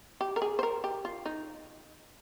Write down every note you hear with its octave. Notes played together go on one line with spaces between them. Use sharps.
G4
A#4
G#4
C5
A#4
G4
F4
D#4